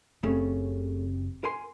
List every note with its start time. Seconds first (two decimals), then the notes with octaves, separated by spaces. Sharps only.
0.23 F#1 C#3 A3 C4 C#4 G4
1.44 A#4 G#5 C6